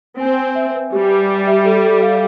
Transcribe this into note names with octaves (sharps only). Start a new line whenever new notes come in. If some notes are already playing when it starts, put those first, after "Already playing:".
C4 G#5
G#5
E5
B4
G3 G4
B4
G4
E5
A4
A4
F5